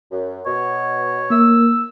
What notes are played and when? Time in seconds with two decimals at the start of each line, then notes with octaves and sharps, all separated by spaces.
0.10 F#2
0.46 B2 C#5
1.30 A#3 E6